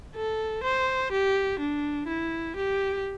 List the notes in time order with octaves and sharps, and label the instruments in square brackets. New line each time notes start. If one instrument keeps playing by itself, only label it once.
[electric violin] A4
C5
G4
D4
E4
G4